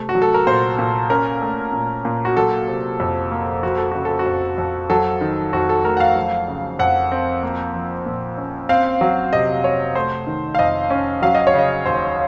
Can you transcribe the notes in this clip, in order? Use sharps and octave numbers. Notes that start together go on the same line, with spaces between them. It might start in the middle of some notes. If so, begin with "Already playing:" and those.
Already playing: C3 A3
F#4
F#3
A4
A#4
A#2 C5
A#2
C#4 A#4
A3
A#2
A#2
F#4
F#3 A4
C3
F2
A#3
F3 F#4
A4
C#3 F#4
A4
F#4
F2
F2
F#3 A4
D#3
F2 F#4
A4
A3 A#4
F#5
F5
F#3
C#3
F2 F#5
C4
A#3
F3
A#2
C#4
C4 F5
F#3
C3 D#5
C3 C#5
A3 C5
D#3
F5
F2 D#5
C#4
F#3 F5
D#5
C#5
C#3 D#5
D#2 C5